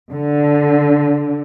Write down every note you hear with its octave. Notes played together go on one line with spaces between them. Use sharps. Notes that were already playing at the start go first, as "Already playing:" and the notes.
D3